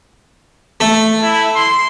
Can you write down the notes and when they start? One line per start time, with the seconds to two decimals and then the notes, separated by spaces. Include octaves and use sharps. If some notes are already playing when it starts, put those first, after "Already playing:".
0.80 A3
1.23 E4
1.56 C6